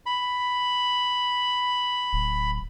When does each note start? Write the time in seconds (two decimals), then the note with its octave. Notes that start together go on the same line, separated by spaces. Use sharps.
0.06 B5
2.13 D1